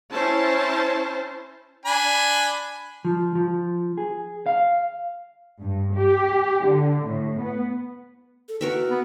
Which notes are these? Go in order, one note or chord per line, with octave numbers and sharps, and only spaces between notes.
C#4 E4 C5 A5
D4 G#5 B5
F3
F3
G#4
F5
G2
G4
D3
A2
B3
A4
F#4 A#4 B4 E5
B3